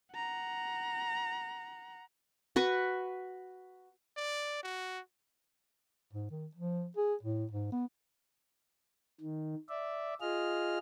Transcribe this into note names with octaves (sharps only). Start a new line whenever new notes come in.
F#5 A#5
F#4 B4 C#6
D5
F#4
G#2
D#3
F3
G#4
A2
G#2
B3
D#3
D5 E5
F4 G#4 D#5 F6